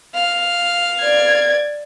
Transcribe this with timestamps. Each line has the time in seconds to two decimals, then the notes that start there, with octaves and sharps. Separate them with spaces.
0.14 F5
1.00 D5 G#6